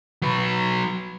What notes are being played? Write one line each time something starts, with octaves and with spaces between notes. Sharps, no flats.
F#3 B4